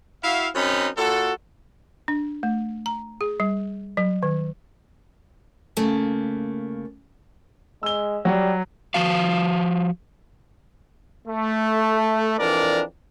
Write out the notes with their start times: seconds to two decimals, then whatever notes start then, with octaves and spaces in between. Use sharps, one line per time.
0.23 E4 F#4 E5 F5
0.55 F#2 C4 C#4 D#4 B5
0.97 A#2 F#4 A4
2.08 D4
2.43 A3
2.86 A#5
3.21 G#4
3.40 G3
3.97 F#3
4.23 D#3
5.77 C#3 A3 A#3
7.83 G#3 E6 G7
8.25 F#3 G3
8.94 F3 F#4 F5
11.28 A3
12.39 F2 E3 D4 A#4 D5